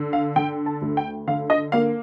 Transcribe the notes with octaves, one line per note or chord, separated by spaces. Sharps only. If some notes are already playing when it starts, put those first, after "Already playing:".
Already playing: D3
F5
D3 G5
A5
D2
G5
D3 F5
D#5
A#3 F5